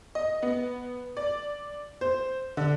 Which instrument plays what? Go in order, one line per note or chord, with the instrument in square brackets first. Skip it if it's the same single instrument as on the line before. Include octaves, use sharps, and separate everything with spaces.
[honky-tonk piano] D#5
B3
D5
C5
D3